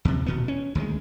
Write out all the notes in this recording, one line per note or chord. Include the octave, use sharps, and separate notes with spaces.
D#2 C3
D#1 B2 B3
C#4
D2 D#3 F#3 G#3